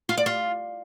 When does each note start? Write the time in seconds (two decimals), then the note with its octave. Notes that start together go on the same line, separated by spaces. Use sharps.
0.09 F4
0.18 D5
0.26 F4